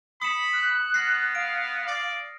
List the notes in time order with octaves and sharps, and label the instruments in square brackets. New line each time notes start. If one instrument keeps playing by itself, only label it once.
[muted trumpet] B5 [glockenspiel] D#6 C#7 E7
[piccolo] F#6
[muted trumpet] B3 [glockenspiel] F6 A#6 C7
[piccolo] F5 [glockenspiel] D7
[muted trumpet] D5